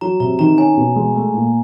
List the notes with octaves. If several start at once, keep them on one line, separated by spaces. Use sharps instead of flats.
F#3 A#5
C3 A#5
D#3 A#5
C#4 G#5
B2
G#3
A3
A#2